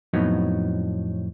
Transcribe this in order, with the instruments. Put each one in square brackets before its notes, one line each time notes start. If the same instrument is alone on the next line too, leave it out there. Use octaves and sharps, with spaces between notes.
[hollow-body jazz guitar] F2 A2 F#3 B3 D#4